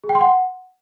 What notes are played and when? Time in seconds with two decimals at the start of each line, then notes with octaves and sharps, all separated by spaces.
0.04 G#4
0.09 G5
0.15 C6
0.21 F#5